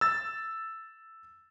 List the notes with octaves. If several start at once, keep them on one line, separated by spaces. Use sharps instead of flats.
E6 A6